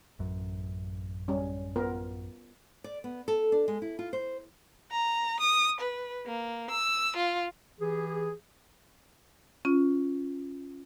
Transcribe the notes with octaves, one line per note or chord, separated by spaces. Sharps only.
A1 F#2
G3 C#4
B3 F4 A#4
D5
B3
A4
D4
G#3
E4
F4
C5
A#5
D#6
B4
A#3
E6
F4
E3 G4 G#4
C#4 F4